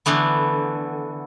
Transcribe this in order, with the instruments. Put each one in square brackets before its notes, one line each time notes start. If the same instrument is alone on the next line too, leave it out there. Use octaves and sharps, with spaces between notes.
[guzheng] D3 E3 A3 B3